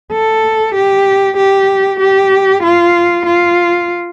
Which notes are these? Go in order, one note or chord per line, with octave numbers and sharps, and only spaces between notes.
A4
G4
G4
G4
F4
F4